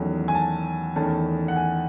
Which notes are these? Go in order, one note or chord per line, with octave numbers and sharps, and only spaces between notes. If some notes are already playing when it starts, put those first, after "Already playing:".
Already playing: E2 D#3 F#3 A3 C#4
G#5
A5
E2 D#3 A3 C#4 A5
F#5
G#5